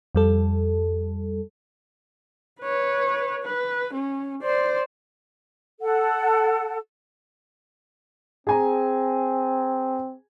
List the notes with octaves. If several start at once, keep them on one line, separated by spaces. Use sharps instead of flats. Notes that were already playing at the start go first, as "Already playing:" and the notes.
F2 G3 A4
B4 C#5
B4
C#4
C5 D5
A4 F#5
C4 G#4 G#5 A#5